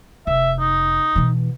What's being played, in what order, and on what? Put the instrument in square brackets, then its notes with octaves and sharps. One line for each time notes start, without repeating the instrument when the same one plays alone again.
[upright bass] F1 [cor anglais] E5
[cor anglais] D#4
[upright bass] B2 E3